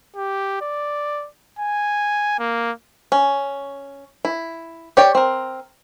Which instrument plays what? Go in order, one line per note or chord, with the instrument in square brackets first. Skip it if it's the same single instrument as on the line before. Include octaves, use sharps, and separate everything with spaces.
[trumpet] G4
D5
G#5
A#3
[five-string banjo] C#4
E4
G4 C#5 D5 G5
C4 A#4